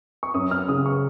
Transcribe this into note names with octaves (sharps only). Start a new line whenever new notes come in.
C#6
F#2 D#6
F6
C#3 D#6
C#6